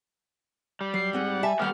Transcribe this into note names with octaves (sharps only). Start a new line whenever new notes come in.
G3
F#3 C7
G#2 C4 G#4 F#5
G4 E5 G#5 A5
D#2 G3 A3 B3 G4 F#5 F6